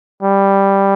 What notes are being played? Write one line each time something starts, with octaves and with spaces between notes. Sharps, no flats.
G3